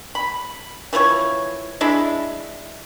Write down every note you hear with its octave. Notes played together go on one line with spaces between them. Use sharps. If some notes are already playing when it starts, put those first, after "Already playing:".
B5
E3 F3 B4 C#5
G#3 D4 E4